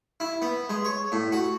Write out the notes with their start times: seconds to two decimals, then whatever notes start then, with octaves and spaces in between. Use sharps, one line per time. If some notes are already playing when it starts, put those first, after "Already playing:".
0.20 E4
0.42 B3
0.69 G#3
0.85 C#5
1.12 A2
1.32 F#4